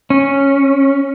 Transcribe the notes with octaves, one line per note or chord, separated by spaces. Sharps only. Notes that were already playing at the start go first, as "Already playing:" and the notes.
C#4